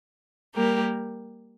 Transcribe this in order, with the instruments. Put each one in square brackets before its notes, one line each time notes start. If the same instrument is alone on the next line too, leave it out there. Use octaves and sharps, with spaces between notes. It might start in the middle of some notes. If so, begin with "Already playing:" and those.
[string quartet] G3 A#3 G4 A#4